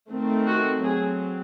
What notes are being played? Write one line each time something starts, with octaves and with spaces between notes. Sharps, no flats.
D#3 A3 C4
F#4
F#3 C4 G#4